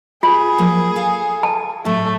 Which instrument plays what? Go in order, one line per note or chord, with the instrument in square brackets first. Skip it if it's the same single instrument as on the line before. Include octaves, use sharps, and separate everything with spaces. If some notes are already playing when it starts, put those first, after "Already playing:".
[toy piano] F4 [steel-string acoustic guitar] G4 [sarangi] G#4
[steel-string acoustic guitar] F3 F#3 A#3
A4 F5
[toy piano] A5
[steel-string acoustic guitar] A2 F#3 [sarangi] A3